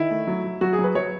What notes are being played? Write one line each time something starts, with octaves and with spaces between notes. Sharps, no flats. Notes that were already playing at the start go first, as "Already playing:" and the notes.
Already playing: D#3 E4
A3
F#3
F#3
F#3 F#4
G#4
F#3
B4
F#3 C#5